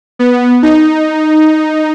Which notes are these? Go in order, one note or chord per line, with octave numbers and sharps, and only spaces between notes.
B3
D#4